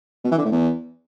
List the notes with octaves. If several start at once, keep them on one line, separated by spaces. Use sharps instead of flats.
B2
E3
D3
A2
E2